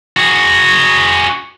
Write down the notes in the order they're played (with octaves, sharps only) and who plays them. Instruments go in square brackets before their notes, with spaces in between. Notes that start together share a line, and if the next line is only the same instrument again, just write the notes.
[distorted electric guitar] F#4 G#4